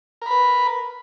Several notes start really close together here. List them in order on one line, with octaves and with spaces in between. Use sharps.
A#4 B5 B4